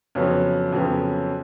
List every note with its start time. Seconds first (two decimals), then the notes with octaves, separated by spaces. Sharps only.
0.15 F2 C#3 F#3 B3
0.72 F2 C#3 F#3 B3